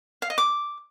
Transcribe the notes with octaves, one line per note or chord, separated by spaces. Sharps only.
F5
D#5
D6